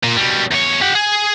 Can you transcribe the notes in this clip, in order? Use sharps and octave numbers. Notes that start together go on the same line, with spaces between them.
A#2
B2 G3
E2 C#5
G4 F#5
G#4